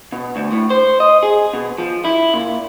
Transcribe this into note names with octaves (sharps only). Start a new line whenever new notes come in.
B2
D2
A2
C5
D#5
G#4
B2
F3
E4
A#2